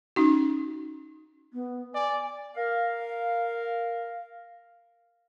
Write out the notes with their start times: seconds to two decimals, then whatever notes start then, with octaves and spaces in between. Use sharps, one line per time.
0.16 C#4 D#4 F#4
1.53 B3
1.94 D5 G#5
2.56 A#4 F5